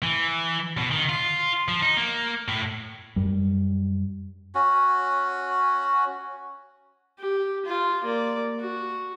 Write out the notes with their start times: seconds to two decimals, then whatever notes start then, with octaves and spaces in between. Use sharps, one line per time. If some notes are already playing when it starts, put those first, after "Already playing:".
0.03 E3
0.78 B2
0.91 D#3
1.09 F4
1.68 F3
1.82 D#4
1.97 A#3
2.48 A2
3.16 F#2 G3
4.55 C#4 F#4
7.19 G4
7.65 F4
8.04 A#3 D5
8.60 F#4